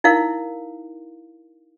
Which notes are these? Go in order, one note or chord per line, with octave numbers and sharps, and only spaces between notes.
D#4 E4 A#4 F5